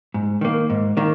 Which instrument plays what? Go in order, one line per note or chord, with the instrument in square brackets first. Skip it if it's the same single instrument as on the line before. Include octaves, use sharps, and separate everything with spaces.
[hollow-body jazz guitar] G#2
D#3 A#3
G#2
D#3 A#3